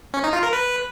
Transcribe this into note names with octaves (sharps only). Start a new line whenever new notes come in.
C#4
D#4
F4
A#4
B4